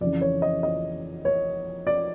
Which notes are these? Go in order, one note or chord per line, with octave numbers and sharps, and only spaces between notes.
F2 C#3 E3 D5
C#5
D#5
D#5
C#5
D5